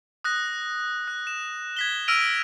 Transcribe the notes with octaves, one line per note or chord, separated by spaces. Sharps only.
D#6 F#6 A#6
F#6
E7
G#6 B6 G7
E6 F6 A#6 D7 D#7 F7